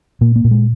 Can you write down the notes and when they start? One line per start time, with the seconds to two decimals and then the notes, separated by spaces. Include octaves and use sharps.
0.21 A#2 A#3
0.36 A#3
0.44 A#2
0.51 G#3